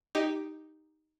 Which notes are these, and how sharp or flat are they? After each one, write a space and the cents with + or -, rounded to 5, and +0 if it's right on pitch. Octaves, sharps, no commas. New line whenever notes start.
D#4 +0 G4 +0